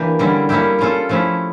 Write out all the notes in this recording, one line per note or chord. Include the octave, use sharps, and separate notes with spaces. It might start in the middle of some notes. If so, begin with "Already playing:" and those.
Already playing: E3 A#3 D4 G4
D3 G3 C#4 E4
G3 A#3 C#4 E4 G4
G3 C#4 F4 A4
F3 A3 C#4 E4